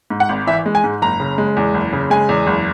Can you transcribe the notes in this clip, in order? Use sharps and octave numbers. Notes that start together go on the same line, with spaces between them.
G#2
F#5
G#1
E3 E5
G#3
G#5
G#2
F#1 A#5
C#3
G#3
E2
F#1
C#3
G#3 G#5
E2
F#1